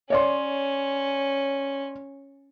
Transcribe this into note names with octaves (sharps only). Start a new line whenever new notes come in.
C#4 C#5 D5 C6